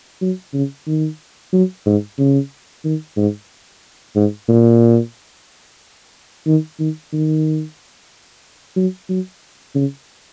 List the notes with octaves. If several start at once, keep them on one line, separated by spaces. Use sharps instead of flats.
F#3
C#3
D#3
F#3
G#2
C#3
D#3
G#2
G#2
A#2
D#3
D#3
D#3
F#3
F#3
C#3